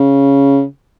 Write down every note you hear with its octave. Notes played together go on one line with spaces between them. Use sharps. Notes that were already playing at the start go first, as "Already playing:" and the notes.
Already playing: C#3